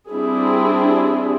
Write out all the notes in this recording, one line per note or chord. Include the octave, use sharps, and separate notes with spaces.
G3 C4 D4 E4 G#4